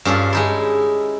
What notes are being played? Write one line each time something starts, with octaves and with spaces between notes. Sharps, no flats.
G2 C#4 F4 A4
G#3 D#4 E4